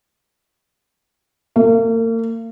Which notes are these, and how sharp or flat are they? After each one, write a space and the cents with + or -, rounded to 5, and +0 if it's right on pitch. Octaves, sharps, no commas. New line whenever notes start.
A#3 -40